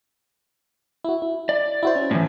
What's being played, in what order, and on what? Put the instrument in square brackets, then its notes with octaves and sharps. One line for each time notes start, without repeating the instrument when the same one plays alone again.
[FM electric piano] E4 F#4
E4
[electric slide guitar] D5
[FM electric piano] E4 F#4 C5
C#4
[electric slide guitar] A2 E3